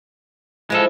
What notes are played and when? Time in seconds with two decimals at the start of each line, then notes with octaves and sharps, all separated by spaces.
0.70 F3 G#3 E4 A4